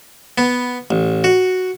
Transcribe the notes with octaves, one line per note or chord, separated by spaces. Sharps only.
B3
A1
F#4